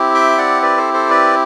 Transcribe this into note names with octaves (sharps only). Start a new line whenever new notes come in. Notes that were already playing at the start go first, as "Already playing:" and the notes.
Already playing: C4 E4 G4
E5 G5
D5 F#5
B4 D5
A4 C5
A4 C5
B4 D5